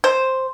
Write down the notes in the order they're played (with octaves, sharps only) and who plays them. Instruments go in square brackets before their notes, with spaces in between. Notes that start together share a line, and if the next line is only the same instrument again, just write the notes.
[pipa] C5